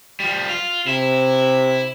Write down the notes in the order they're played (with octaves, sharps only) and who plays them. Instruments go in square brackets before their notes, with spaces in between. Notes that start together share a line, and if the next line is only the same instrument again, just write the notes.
[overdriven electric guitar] F3 G3
F4
[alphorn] C3 [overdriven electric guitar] E4